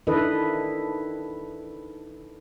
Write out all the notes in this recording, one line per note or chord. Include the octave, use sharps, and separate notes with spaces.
D#3 D4 E4 A4 B4 D#5